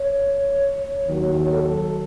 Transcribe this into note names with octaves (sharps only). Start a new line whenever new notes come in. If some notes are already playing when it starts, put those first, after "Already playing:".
Already playing: C#5
D#2 D#3 F#3
A4